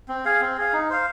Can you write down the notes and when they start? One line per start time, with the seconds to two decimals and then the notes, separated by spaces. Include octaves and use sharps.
0.08 C4
0.25 G#4 F5
0.41 C4
0.57 G#4 F5
0.73 D#4
0.90 C5 F5